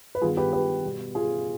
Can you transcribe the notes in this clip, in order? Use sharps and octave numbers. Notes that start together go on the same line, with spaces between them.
B4
G2 D#3 B3 F4 G#4
G4 B4
G4 B4
B2 G3 B3
F4 G#4